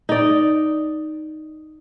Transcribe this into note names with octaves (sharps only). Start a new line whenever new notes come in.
D#4 D5